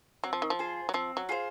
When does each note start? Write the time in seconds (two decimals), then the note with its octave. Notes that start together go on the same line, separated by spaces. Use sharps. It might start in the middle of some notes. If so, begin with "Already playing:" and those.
0.24 F#3 C4
0.33 F3
0.42 D#3
0.50 F3
0.59 F4 G#4 C5
0.89 F#3
0.94 F3 C4
1.17 F#3
1.29 F4 G#4 C5